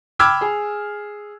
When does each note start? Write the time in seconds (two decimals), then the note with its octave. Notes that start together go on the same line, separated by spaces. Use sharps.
0.19 G5 B5 D6 E6 F6 G#6
0.41 G#4